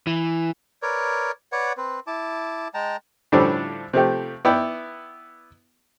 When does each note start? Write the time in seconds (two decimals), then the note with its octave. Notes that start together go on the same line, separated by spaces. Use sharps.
0.07 E3
0.82 A#4 B4 C#5 D5
1.52 B4 C#5 D5 F#5
1.77 C4 B4
2.07 E4 A5 D6
2.74 G#3 G5 A5 A#5
3.32 A2 D3 F3 G3 C#4 D4
3.93 C3 F3 A3 G4
4.45 B3 E4 D5 G5